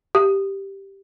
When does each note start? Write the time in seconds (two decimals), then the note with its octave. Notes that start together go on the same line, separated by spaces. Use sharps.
0.15 G4